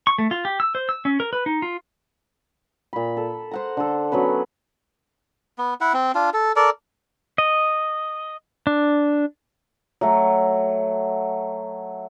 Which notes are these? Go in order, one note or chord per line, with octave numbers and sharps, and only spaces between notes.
C#6
A3
F4
G4
E6
C5
E6
C#4
A#4
B4
D#4
F4
A#2 B5
A4
C5 F#5 A#5
D3 A4
F#3 B3 C#4 B4
B3
E4 F#5
C4
D4 F4
A4
A4 A#4 D5
D#5
D4
F#3 A3